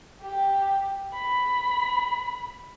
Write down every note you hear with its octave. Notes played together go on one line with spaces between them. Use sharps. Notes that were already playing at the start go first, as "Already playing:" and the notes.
G4
B5